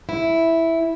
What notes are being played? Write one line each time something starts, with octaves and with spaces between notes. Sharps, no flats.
E4